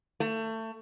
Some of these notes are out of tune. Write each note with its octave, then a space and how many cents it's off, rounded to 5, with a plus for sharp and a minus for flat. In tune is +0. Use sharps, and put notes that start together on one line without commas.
A3 +25